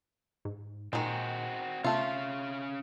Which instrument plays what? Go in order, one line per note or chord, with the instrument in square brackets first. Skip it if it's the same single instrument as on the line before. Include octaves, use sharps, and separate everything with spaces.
[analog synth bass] G#2
[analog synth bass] A#2 [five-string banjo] D#3 G#3 [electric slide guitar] C4 F#4
[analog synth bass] C3 [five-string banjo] A3 F4 [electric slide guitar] C#4 F5